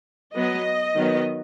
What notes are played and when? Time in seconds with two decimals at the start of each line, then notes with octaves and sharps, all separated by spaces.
0.34 F#3 B3 D#5
0.96 D#3 F#3 B3